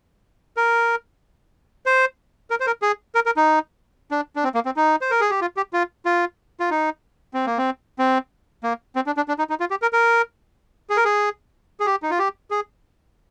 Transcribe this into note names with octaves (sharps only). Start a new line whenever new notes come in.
A#4
C5
A#4
C5
A#4
G#4
A#4
A#4
D#4
D4
D4
C4
A#3
C4
D#4
C5
A#4
G#4
G4
F4
G4
F4
F4
F4
D#4
C4
A#3
C4
C4
A#3
C4
D4
D4
D4
D#4
D#4
F4
G4
A#4
A#4
G#4
A#4
G#4
G#4
G4
D#4
F4
G4
G#4